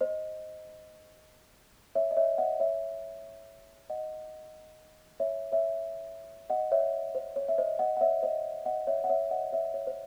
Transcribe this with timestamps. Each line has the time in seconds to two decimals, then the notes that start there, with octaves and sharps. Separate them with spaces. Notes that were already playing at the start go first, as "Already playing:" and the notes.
0.01 C5 D#5
1.95 C#5 E5
2.11 D#5
2.16 C#5 E5
2.38 D#5 F#5
2.60 C#5 E5
3.90 D#5 F#5
5.20 C#5 E5
5.52 C#5 E5
6.50 D#5 F#5
6.72 C#5 E5
7.15 C5
7.36 C#5
7.48 E5
7.58 C5 D#5
7.79 D#5 F#5
7.97 F#5
8.01 C#5 E5
8.23 C5 D#5
8.65 D#5 F#5
8.87 C#5 E5
9.04 F#5
9.10 C#5 E5
9.31 D#5 F#5
9.52 C#5 E5
9.74 C#5
9.87 C5